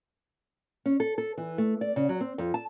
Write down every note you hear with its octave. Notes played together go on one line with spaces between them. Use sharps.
C#4
A4
A4
E3
A3
D5
C#3
F#3
C4
F2
A5